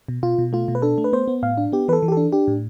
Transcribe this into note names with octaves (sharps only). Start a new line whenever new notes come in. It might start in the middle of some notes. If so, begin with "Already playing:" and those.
B2
B2 F4
B2
A3 F4
B2
B4
D4 A4
A3
B4
B3 C5
B3
A2 F5
D4
B3 G4
E3 A4 B4
E3
G4
D4 A4
D4 G4
A2